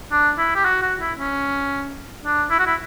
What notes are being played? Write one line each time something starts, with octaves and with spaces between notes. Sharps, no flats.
D4
E4
G4
F#4
F#4
E4
C#4
D4
E4
F#4
E4